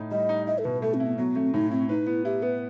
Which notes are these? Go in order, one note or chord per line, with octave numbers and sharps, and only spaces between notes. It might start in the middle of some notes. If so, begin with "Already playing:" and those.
Already playing: A2 D#4
G3 D#5
D#4
E4 D#5
A4
B2 B4
A3 A4
C4
E4
B3
F#3 B3
A3 C4
A2 D#4
C4 E4
D#4 B4
B3 E4
E4 G4
B3 B4